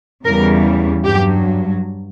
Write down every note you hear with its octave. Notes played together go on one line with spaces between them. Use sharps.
E2 C#3 E3 G3 A#4
G2 F#3 G4